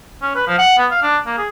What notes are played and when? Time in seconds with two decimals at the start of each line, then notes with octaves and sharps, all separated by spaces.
0.22 C#4
0.35 B4
0.47 F3
0.58 F#5
0.78 B3
0.91 F5
1.02 D4
1.26 A#3
1.38 G#4